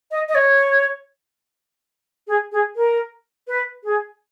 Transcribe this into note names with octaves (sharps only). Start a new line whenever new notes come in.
D#5
D#5
C#5
G#4
G#4
A#4
B4
G#4